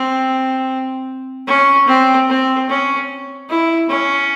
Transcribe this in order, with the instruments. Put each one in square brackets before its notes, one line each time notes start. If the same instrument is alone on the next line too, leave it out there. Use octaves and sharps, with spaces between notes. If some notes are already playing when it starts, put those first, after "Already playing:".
Already playing: [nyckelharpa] C4
C#4
C4
C4
C#4
E4
C#4